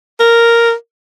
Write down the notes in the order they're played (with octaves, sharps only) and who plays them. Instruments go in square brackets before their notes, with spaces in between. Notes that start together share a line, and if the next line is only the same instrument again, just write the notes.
[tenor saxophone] A#4